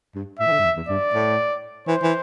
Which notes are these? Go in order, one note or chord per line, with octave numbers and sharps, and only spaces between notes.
G2
A2 E5
E3
D3
G2
E2
E2
G2 D5
A2
E3 C5
E3